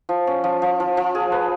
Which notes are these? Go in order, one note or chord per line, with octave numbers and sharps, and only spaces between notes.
F3
C#4
F3
F3
F3
F3
G#4
B4